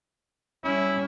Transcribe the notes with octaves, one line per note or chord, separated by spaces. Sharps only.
G3 C#4 E4